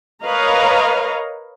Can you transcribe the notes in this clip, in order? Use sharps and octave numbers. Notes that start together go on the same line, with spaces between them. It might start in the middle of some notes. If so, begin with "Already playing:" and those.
A#4 B4 C#5 D#5 F5 A#5